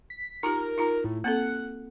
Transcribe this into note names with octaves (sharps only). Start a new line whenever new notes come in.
B6
D#4 F4 G4 A#4
D#4 F4 A#5
A2
A#3 C4 A4 F#5